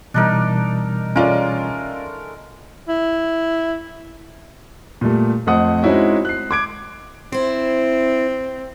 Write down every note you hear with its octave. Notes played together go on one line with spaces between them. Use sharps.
B2 E3 G3 D4 D#4 A#4
G#3 A3 C#4 F4 A#4 D5
E4
A#2 G3 A3
F2 A3 C5 D#5 F#5 D#6
G#3 C4 C#4 D#4 E4 F#4
F#6 C7
D6 G#6 D7
C4 E4 C5